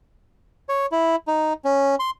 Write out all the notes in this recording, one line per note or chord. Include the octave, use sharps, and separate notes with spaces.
C#5
E4
D#4
C#4
C6